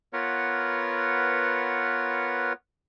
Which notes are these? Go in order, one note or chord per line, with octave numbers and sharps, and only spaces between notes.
B3 F4 A#4 B4 C#5 F#5